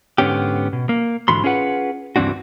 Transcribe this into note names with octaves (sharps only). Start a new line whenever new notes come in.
G#2 D3 B3 C#4 G4
B2
A#3
G#2 D3 E3 F#4 B5 C6
C#4 F4 G#4 B4 F#5
C#2 G2 E3 C4 D4 F#4